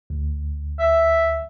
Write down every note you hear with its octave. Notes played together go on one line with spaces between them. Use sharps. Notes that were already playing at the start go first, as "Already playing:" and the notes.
D2
E5